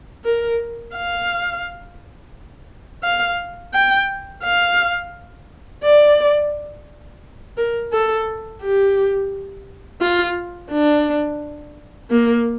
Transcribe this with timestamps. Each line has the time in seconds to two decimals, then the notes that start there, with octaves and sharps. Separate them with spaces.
0.25 A#4
0.94 F5
3.03 F5
3.74 G5
4.43 F5
5.83 D5
7.57 A#4
7.92 A4
8.62 G4
10.01 F4
10.71 D4
12.10 A#3